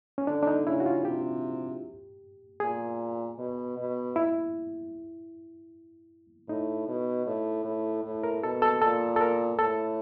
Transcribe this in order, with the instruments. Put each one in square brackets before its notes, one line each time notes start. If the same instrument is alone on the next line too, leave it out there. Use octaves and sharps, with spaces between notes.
[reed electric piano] C#4
[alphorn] D3 [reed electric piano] D4
[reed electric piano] D4
D#4
[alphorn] C#3 [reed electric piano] E4
[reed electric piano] F#4
F4
[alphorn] C3 [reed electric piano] G4
[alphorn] A#2 [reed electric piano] G#4
[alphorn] B2
B2
[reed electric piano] E4
[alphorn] A2 [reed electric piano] D#4
[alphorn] B2
A2
A2
A2
[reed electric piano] A#4
[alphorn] B2 [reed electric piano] A4
[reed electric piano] A4
[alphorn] A#2 [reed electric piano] A4
[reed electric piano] A4
A#4
[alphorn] A2 [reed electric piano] A4